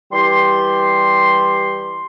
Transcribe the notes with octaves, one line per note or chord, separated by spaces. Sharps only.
E3 G3 G4 C6